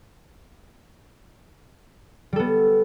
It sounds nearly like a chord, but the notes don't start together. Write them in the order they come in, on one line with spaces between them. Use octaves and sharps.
G3 A4 B3